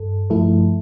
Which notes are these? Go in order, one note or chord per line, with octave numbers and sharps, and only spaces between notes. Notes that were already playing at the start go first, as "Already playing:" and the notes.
Already playing: G2 A4
G2 F3 A3 E4 A4